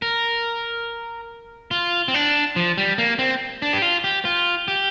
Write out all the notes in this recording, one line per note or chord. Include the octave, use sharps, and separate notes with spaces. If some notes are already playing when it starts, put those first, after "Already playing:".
A#4
F4
C4
D4
F3
G3
A#3
C4
D4
G4
F4
G4
F4
G4